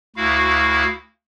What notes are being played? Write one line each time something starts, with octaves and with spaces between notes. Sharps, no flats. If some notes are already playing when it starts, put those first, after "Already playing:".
D2 E4 F#4 F5